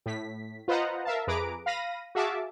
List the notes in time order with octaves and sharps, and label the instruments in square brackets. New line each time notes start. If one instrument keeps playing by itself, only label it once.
[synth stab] A2 B6
F4 B4 C5 D#5 F#5 A#5
A#4 E5 F5 A5
F2 G#4 B4 A#5 D6 D7
F5 B5 A#6 D#7
F#4 G#4 E5 F5 A5 D6